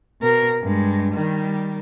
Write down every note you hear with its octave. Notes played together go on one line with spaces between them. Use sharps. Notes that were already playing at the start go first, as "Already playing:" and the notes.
B2 A#4
G2 G#3
D#3 G3